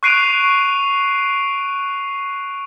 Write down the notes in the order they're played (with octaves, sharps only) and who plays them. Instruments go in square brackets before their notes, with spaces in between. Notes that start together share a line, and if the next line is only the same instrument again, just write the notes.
[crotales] C#6 F#6 C7 D7 D#7 F7